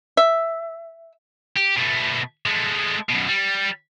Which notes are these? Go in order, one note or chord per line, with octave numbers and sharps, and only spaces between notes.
E5
G4
B2 A3
G#3 A3
F#2 B2
G3